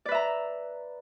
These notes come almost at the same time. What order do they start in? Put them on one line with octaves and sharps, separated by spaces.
D5 B4 E5 A#5